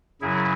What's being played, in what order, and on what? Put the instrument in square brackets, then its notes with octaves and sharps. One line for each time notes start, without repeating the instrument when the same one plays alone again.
[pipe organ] F#2 C#3 F#3 E4 G#4